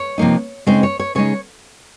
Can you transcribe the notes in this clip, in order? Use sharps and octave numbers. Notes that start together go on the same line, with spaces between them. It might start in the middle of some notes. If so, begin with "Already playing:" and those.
Already playing: C#5
C3 F3 A#3 D#4
C#3 G#3 C4 D#4 C5
C#5
C#5
C#3 G#3 D#4 C#5